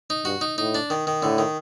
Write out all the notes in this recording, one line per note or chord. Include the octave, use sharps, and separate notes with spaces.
D#4
G2 F#4
D#4
A2 D#4
D4
D#3
D#3
A2 D3
D#3